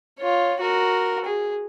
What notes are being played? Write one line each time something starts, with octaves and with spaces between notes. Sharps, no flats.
F4 C#5
F#4 A#4
G#4